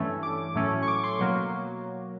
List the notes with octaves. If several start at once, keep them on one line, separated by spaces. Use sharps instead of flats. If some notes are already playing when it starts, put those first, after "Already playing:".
Already playing: G2 E3 A3 C#4
D6
A2 F#3 A3 C#4
C#6
D6
C6
B2 F#3 A#3